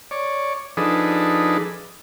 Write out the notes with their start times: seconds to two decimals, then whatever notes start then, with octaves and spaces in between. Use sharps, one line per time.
0.11 C#5 D5
0.77 F3 D4 D#4 G#4 A4 B4